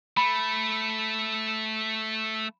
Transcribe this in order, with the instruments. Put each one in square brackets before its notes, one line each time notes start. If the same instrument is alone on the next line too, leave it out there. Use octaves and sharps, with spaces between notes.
[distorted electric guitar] A3 [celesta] B5